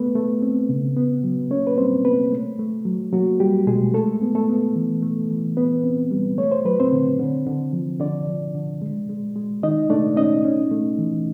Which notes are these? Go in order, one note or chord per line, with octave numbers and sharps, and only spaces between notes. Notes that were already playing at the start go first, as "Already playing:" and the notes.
Already playing: A3 B3 B4
A3
C4
C#3
B3
F#3
A#3 C#4 C#5
B4
G3 C4 C5
A#3 B3 B4
A3
A3
F#3
F#3 A#3 F#4
G3 G4
B2 G#3 G#4
G#3 A3 A4
B3
A3 A4
B3
E3
A3
E3
E3 B3 B4
C4
G3
A3 C#5
C5
F#3 B4
C4 C5
D3
D3
D3
F3
D3 D4 D5
F3
D3
G#3
G#3
G#3
D#3 D#4 D#5
A3 D4 D5
C#4 D#4 D#5
C#4
A3
E3